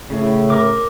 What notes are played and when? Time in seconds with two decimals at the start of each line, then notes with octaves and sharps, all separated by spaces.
0.10 A2 C#3
0.50 A#4 D6